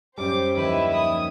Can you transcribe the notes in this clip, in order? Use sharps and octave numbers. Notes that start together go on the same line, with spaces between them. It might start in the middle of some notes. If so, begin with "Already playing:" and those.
F#2 G3 G4 C5 D6
D#2 F3 E4 B4 C5
D#6